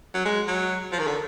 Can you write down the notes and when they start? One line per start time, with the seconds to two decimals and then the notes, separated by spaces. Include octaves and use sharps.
0.14 F#3
0.25 G#3
0.48 F#3
0.92 F3
0.99 D#3
1.07 D3